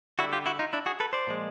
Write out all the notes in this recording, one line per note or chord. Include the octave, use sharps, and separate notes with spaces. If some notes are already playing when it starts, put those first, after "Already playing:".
D3 G3 E4 F#4
F4 G4
E4 F#4
D#4 F4
D4 E4
F#4 G#4
A4 B4
C5 D5
A#2 F3 G#3